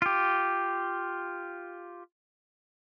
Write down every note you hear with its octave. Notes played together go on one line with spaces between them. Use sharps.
F4 G4